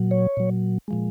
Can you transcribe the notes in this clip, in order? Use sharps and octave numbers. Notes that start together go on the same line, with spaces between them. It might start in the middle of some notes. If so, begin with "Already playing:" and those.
Already playing: A#2 F#3
C#5
A#2 F#3
A#2 F3 G#3